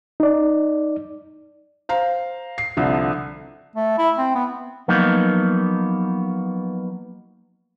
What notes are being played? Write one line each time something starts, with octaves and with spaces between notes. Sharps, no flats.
D#4 D5
C5 F5 A#5
C7
C2 D3 F3
A3
E4
C4
B3
F3 F#3 A#3 B3 D#4